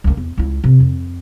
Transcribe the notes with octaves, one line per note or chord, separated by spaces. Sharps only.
C#2 A#3
E2
C#2 E4
C3 D#3
F2